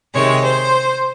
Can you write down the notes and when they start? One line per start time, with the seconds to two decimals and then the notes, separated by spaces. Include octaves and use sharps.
0.14 C3 D#3 G#3 C#5
0.43 C5